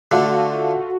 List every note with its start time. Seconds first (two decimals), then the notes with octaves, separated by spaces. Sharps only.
0.11 D3 A3 F4 F#4 A4